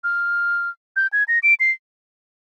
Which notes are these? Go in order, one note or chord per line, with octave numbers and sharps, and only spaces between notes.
F6
G6
G#6
A#6
D7
C7